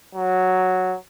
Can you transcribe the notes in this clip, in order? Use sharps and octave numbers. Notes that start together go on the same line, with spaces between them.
F#3